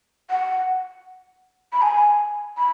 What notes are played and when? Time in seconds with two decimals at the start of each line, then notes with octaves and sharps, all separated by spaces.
0.31 F#5
1.73 B5
1.82 G#5
2.57 B5